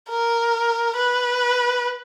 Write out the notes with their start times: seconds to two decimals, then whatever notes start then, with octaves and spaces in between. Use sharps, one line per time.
0.10 A#4
0.96 B4